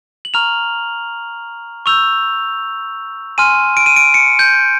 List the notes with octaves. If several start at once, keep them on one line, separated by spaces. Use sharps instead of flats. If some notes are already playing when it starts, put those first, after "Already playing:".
F#7
A#5 C#6 F6 F7
C#6 E6 G6 F7
G#5 C6 F6 D#7
D7
D#7
D7
C#7
G6